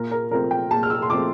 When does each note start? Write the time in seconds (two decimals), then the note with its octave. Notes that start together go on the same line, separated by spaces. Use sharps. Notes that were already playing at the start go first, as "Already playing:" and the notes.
Already playing: A#2 A#4
0.11 A#4
0.31 F3 A3 C4 A#4
0.51 G5
0.71 A#2 A5
0.83 F6
0.90 E6
1.02 C6
1.10 F3 A3 C4 D6